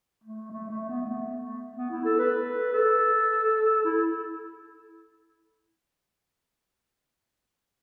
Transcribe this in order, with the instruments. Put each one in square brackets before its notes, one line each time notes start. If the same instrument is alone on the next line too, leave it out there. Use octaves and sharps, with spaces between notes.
[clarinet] A3
A3
A3
B3
A3
B3
E4
A4
B4
A4
E4